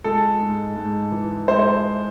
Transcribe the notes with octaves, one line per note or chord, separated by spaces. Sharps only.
G#3 A4
G#2
G#2
E3
G#3 C5
C5